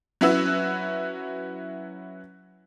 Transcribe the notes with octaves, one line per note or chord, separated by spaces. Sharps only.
F#3 C#4 E4 F#4 B4 E6